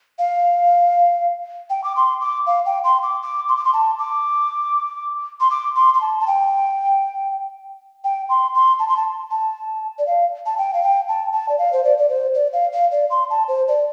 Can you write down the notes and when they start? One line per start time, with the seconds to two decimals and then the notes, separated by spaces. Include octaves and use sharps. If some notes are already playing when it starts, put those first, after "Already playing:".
0.19 F5
1.70 G5
1.84 D6
1.96 C6
2.21 D6
2.47 F5
2.66 G5
2.84 C6
3.03 D6
3.23 D6
3.49 C6
3.57 D6
3.65 C6
3.73 A5
3.99 D6
5.40 C6
5.51 D6
5.76 C6
5.94 C6
6.01 A5
6.20 A5
6.27 G5
8.04 G5
8.29 C6
8.55 C6
8.79 A5
8.89 C6
8.97 A5
9.31 A5
9.99 D5
10.07 F5
10.46 A5
10.58 G5
10.74 F5
10.83 G5
11.08 A5
11.33 A5
11.49 D5
11.58 F5
11.73 C5
11.84 D5
11.98 D5
12.09 C5
12.34 D5
12.53 F5
12.73 F5
12.92 D5
13.10 C6
13.30 A5
13.48 C5
13.68 D5